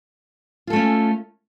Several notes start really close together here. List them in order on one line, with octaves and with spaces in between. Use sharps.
F4 A4 A3 C#4